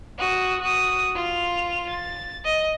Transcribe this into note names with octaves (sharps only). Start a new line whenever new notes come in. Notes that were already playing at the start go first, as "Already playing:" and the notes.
F#4 D#6
F#4 D#6
F4 F7
A6
D#5